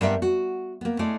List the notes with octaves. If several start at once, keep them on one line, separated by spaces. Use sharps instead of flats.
G2 G3 B3 A#4 B4 E5
F#4
A#3 B3
G#3 A3 E4 D5